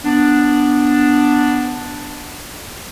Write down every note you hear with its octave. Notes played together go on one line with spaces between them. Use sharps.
B3 D4